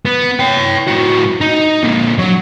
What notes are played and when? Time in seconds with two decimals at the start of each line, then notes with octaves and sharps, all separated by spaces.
0.05 B3
0.40 C#5 G5
0.88 A2 F#4
1.41 D#4
1.84 A#2 D3
2.18 F#3